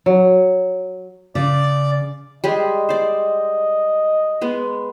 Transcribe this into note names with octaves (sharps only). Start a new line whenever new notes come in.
F#3
C#3 D5
G3 G#3 G#4 D#5
C5 D5
G#3 B3